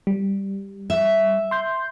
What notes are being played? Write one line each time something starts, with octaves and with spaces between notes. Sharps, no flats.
G3
E5
C6 G6